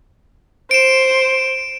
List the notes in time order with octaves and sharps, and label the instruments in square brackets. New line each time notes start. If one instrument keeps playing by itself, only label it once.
[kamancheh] C5 [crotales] D7 E7